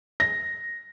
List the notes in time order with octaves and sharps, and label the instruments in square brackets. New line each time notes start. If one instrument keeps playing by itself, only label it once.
[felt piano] A#6